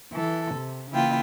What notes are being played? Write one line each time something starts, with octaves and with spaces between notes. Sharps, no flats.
E3 A4
C3
C#3 E3 A#3 E4 F4 G5